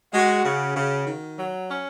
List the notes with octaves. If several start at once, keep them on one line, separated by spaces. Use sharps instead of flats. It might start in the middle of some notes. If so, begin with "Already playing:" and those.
G#3 F#4
C#3
C#3
D#3
F#3
C#4